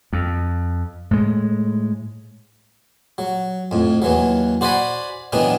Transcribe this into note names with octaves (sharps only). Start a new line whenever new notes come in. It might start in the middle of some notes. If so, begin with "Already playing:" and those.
F2
A2 G#3
F#3
F2 A2
D#2 E3 F#3
F#4 C5 D5 F#5 G#5 B5
D#3 E3 F#3 B3 D4